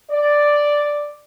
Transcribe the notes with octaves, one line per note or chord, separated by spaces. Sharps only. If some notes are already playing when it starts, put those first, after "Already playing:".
D5